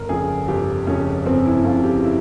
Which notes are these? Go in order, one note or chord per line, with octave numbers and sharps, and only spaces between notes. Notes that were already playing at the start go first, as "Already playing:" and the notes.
Already playing: G1 A#4
F2 C#3 G#4
G1 G4
F2 C#3 C#4
G1 C4
E4
F2 C#3 F4
G4
E4